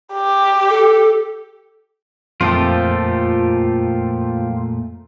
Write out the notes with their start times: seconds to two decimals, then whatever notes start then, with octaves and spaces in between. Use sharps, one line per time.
0.13 G4
0.70 A4
2.41 F2 A#2 F3 A3 F4 G4 A4